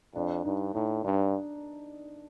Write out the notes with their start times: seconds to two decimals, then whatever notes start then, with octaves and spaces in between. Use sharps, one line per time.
0.15 F2 D4
0.45 G2 D#4
0.74 A2 D#4
1.04 G2 D4